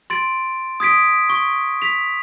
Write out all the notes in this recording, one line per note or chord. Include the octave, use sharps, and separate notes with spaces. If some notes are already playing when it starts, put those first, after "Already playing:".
C6 A6 D7
D#6 G#6 B6 D7
C#6
B6 F7